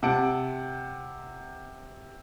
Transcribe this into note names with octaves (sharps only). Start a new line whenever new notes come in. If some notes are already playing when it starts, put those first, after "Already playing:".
C3 F#5 A5 D7